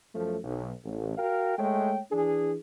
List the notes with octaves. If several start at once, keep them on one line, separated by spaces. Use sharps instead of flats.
F#2 F3 A3
B1
A1
F#4 A#4 F5 G5
G#3 A3 C#5 G5
E3 D4 G#4